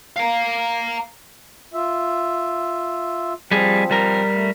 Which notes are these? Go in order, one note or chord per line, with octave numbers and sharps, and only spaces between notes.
F5 A#5
F4 E5
F3 G3 C4 G#4
G3 A#4
A3